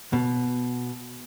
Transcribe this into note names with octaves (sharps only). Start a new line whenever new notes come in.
B2